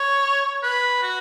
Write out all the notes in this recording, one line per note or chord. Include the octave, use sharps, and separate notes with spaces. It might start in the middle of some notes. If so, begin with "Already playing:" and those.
Already playing: C#5
B4
F#4